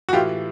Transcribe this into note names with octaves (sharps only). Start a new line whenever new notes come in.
F#4
A2 E3 F4 G4